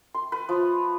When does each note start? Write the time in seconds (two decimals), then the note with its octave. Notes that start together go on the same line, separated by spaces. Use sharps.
0.14 C6
0.32 B4
0.49 F3